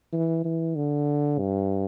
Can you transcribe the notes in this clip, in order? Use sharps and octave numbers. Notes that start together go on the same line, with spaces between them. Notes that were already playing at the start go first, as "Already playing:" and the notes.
E3
E3
D3
G2